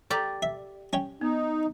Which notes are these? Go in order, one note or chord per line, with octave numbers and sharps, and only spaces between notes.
G4 A4 D5 A#5
E5
C#4 C#5 G5
B3 D#4